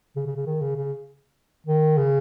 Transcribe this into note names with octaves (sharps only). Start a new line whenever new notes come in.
C#3
C#3
C#3
D#3
C#3
C#3
D#3
C#3